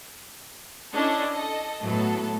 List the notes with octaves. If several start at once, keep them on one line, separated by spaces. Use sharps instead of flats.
C#4 D4 E4 A4 D#5
A4 D#5
A2 F#3 B3 A4